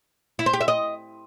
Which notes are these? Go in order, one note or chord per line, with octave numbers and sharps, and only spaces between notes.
E4
C5
G4
E5
D#5